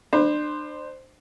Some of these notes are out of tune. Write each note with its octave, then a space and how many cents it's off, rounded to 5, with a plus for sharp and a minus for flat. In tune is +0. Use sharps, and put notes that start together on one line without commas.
D4 +35 C5 +0 B5 +0